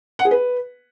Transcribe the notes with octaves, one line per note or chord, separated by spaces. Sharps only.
F#5
G#4
B4